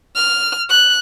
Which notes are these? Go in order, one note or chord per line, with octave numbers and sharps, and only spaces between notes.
F6
F#6